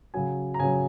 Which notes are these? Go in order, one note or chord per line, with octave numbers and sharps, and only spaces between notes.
C#3 F#3 G#5
A#5
C#3 F#3 G#5